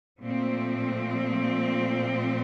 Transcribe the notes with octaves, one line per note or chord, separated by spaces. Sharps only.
A#2 F3 A3 C4